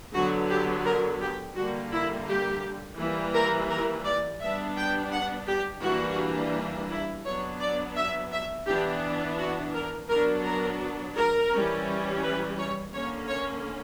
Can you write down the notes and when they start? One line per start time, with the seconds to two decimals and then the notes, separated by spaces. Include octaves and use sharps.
0.14 D3 F#3 B3 F#4
0.50 G4
0.85 A#4
1.21 G4
1.56 D3 G3 A#3 F#4
1.92 E4
2.28 G4
2.99 E3 G3 A#3
3.34 A#4
3.70 A#4
4.05 D5
4.41 G3 B3 D4 E5
4.77 G5
5.11 F#5
5.48 G4
5.83 E3 G3 A#3 D4 F#4
6.90 E4
7.25 F#3 B3 D4 C#5
7.60 D5
7.95 E5
8.31 E5
8.67 E3 B3 D4 G4
9.38 F#4
9.74 A#4
10.09 F#3 B3 D4 A#4
10.44 A#4
11.16 A#4
11.51 E3 G3 C#4
12.23 B4
12.58 C#5
12.93 D3 A#3 C#4 C#5
13.29 C#5